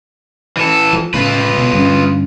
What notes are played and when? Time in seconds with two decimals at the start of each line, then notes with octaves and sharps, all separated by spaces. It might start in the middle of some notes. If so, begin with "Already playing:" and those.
0.57 E3 A4
0.93 F3
1.14 A2 C#3 F4 B4
1.58 B2
1.73 G2 D3 C#4